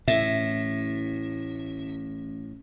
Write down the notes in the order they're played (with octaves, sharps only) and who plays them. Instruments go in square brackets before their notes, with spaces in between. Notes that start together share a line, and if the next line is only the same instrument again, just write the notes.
[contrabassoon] A1 [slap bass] A2 [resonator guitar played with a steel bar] E5